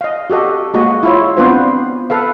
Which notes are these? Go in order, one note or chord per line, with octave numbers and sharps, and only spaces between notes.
D#5 F5
F#4 G4 A4 D#5
G#3 A#3 F#4 D#5
E4 F4 C#5
B3 C4 D4 F4 B4 C5
A4 B4 F5